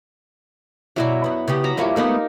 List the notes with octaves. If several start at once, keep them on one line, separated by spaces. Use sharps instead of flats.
G2 B2 F#3 E4 C#5 D5
F#2 B3
C#3 B3 G4
F#3 A#5 B5
G2 F3 A#3 E4 G4 C#5
G#3 A3 B3 D#4 A#4